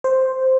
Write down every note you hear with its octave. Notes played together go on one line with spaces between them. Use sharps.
C5